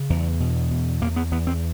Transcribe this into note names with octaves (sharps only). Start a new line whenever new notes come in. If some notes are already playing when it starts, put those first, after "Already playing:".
Already playing: C#3
E2
B2
E2
E2 A#3
B3
E2 B3
C4